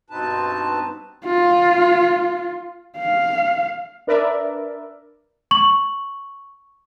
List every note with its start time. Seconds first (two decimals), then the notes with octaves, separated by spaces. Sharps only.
0.10 G2 B2 C4 D#4 B4 A5
1.25 F4
2.98 F5
4.07 D4 A#4 B4 D5 E5
5.51 C#6 F#7